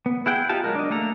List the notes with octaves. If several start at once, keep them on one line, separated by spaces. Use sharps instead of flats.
B3
E4 G#4 F#5 G5
D#4 F4 G4 A5
F#3 G#3 A#4
D4 D#5
A3 A#3 A4 A#5